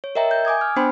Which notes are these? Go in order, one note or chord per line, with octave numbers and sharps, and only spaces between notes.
C#5
A#4 D#5 E5 G5 A#5
G6
G#5 D6 D#6 G#6
F6
B3 D4 C5 G5 B5 C6